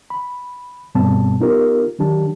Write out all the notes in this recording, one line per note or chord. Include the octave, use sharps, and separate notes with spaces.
B5
G2 B2 G3 B3 C4 A5
B3 D#4 F4 G4 A#4
D#3 F#3 D4 G4 A5